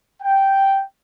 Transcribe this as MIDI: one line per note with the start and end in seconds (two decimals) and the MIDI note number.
0.22 0.82 79